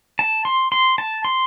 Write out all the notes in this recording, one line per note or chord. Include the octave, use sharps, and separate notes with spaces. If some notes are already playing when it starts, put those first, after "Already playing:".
A5
C6
C6
A5
C6